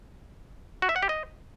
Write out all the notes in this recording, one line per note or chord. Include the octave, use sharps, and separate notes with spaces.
F#4
E5
F#5
G4
D#5